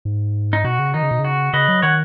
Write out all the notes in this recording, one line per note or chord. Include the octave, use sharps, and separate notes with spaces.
G#2
D#4
B2 F#4
C#3
D#3 D#4
C#3
B2
C#3
F#4
C#3 B4 D#5
F#3
D#3 C#5 F#5